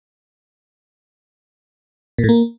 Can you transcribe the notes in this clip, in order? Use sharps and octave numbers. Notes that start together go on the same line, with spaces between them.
A#2
A2
A#3